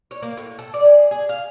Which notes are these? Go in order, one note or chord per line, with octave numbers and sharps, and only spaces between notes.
C#5
A#3
A2
A4
D5
G#4
G#4
F5